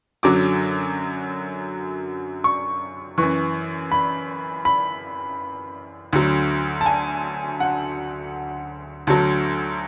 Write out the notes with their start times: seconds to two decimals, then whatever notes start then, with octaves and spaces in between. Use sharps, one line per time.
0.23 F#2 D3 F#3 D6
2.44 C#6
3.18 F#2 E3 C#6
3.92 B5
4.65 B5
6.13 D2 D3 F#3
6.81 A5
6.86 G#5
7.60 F#5
9.07 D2 D3 F#3 A5